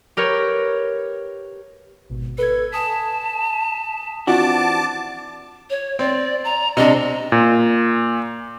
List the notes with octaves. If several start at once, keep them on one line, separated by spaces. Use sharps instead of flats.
G4 A#4 B4 C#5
G#1 B2
A4 B4 G#6
G#5 A5 D#6 B6
E3 C4 D4 F4 F#4 F#5 A5 D6
C#5
C4 D5
A#5
C3 D4 D#5
A#2